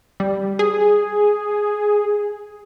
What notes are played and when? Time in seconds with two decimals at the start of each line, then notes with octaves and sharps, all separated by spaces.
0.20 G3
0.59 G#4